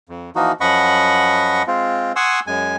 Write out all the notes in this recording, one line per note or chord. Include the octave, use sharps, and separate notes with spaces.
F2
E3 F3 A#3 D#4 F#4
F#2 F3 D#5 F#5 B5 C#6
G#3 C4 F4
F#5 G#5 C6 C#6 D#6 E6
F#2 G#3 G#5